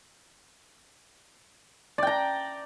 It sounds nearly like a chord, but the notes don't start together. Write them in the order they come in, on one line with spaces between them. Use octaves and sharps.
D5 G5 A#5